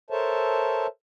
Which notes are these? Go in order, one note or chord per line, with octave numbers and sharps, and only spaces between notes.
A4 A#4 C5 C#5 E5 A5